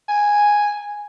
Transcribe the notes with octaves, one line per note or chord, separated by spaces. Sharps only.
G#5